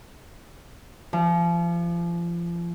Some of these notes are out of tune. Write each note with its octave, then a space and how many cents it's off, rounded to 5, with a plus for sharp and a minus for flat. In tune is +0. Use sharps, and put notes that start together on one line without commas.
F3 -30